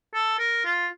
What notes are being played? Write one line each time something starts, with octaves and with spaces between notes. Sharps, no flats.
A4
A#4
F4